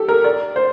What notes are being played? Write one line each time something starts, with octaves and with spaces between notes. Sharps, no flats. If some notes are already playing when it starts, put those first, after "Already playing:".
Already playing: G4 A4
A#4
D5
C5